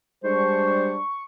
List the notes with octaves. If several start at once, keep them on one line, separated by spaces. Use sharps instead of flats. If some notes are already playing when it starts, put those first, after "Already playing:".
G3 G#3 D4 C5 C#6